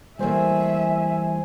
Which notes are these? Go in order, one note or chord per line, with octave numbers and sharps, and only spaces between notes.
E3 G3 A3 A#3 C5 E5 G#5